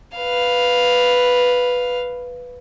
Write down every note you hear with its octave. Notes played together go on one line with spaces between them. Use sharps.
B4 F5